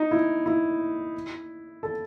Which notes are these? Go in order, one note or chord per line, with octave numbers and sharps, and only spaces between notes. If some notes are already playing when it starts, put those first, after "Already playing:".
Already playing: D#4
E4
E4
A4